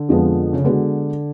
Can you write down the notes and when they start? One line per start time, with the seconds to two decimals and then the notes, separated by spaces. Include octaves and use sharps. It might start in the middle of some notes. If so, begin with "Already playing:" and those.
Already playing: D3
0.09 F2 F3 G#3 B3
0.53 C#3
0.64 D3 G#3 B3 F#4 B4